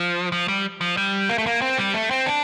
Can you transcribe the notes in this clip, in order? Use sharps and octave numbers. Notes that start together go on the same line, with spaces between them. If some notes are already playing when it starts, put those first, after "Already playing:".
Already playing: F3
F3
G3
F3
G3
A#3
A3
A#3
C4
G3
A3
C4
D4